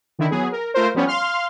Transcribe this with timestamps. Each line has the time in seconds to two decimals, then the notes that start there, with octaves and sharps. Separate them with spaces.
0.19 D3 D#3 E4
0.31 F#3 B3 G#4
0.52 A#4
0.74 A3 F4 A#4 C5
0.95 F3 G3 B3 C#4
1.07 F5 C6 F6